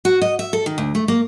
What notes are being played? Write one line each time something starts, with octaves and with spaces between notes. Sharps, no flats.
F#4
D#5
E5
A4
D#3
D2
A3
A#3